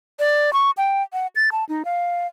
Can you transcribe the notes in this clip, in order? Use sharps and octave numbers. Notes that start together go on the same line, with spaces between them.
D5
C#6
G5
F#5
A6
A5
D#4
F5